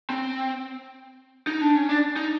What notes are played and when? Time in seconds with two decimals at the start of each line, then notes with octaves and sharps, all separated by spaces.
0.10 C4
1.47 D#4
1.61 D4
1.75 C#4
1.89 D4
2.16 D#4